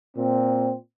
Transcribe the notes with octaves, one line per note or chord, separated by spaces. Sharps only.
A#2 C4